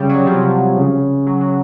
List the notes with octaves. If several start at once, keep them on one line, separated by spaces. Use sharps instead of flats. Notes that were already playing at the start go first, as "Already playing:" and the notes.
Already playing: C#3 G3
F#3
C3 F3
C#3
F#3
F#3